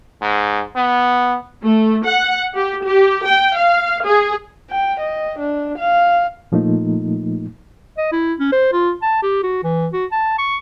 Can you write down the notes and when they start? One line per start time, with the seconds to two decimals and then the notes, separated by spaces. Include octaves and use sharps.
0.21 G#2
0.76 B3
1.62 A3
2.04 F#5
2.56 G4
2.86 G4
3.26 G5
3.56 F5
4.05 G#4
4.70 G5
5.00 D#5
5.39 D4
5.78 F5
6.52 A#2 F3 A3 A#3 D#4
7.97 D#5
8.12 E4
8.39 C#4
8.52 C5
8.72 F4
9.02 A5
9.22 G4
9.43 F#4
9.64 E3
9.93 F#4
10.12 A5
10.38 C#6